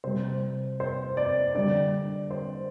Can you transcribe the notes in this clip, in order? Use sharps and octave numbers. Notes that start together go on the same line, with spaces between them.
C3 G3 C5
C5
D5
D3 G3 D5
C5